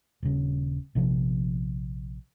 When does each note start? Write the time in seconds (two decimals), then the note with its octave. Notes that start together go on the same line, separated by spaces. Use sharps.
0.23 D#1 C#3
0.95 A#1 C3 F3